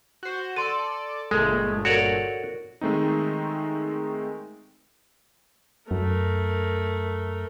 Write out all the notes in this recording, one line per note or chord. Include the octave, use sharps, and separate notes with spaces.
F#4 C5
A4 D5 C6 D#7
G1 A#2 G#3 A3 A4
F#4 A4 A#4 C#5 D5
D#3 G#3 A3 C4 D#4
F#2 A3 A#4